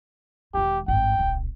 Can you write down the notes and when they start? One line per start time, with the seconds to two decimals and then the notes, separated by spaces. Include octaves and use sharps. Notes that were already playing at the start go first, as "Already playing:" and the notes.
0.54 E1 D#3 G4
0.88 G#1 G2 G5
1.19 D1 B1